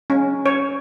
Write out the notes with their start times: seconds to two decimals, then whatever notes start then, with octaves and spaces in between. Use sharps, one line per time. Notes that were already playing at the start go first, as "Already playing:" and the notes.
0.10 C#4
0.46 C#5